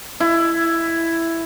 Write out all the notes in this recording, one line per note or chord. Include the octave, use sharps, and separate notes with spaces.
E4